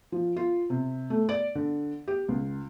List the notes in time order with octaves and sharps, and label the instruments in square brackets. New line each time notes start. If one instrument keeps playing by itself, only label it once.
[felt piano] F3
F4
C3
A3
D5
D3
G4
C#2